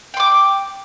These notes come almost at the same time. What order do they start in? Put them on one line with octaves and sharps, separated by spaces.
G5 C6 D6